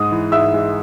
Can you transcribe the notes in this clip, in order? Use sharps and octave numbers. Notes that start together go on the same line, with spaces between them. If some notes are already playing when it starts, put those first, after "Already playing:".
Already playing: G#2 G#3 D#6
E3
G#2 E5 E6
G#3